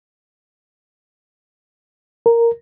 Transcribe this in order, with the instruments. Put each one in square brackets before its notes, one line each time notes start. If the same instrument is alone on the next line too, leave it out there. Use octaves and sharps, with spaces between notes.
[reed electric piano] A#4